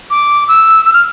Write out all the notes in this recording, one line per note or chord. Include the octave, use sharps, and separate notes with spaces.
D6
E6
E6
F6